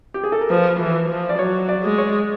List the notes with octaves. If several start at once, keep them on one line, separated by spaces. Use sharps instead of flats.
G4
G#4
A4
A#4
F3 B4
E3
F3
D5
F#3 C#5
D5
G#3
C#5